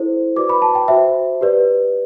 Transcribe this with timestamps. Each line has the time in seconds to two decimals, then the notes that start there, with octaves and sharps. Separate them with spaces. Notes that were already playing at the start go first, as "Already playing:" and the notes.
Already playing: E4 A4 C5
0.36 F#4 B4 D5 D6
0.49 B5
0.62 A5
0.75 G5
0.88 F#4 C5 E5
1.41 G4 B4 D5